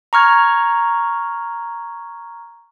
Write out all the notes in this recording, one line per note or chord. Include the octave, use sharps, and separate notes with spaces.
A#5 C#6 F6 G#6